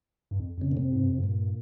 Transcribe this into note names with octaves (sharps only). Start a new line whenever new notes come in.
G2
F2
F2 C#3
A#2
C3
G#2
G2
F2
G2
A#2